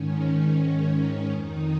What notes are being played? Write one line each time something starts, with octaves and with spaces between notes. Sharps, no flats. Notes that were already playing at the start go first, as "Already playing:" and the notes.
Already playing: G#2 D#3 C#4
G#2 D#3
F2 D#3 D#4